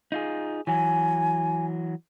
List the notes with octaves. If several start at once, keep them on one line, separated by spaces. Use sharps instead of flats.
D#4 F4 G#4
E3 F#3 G#5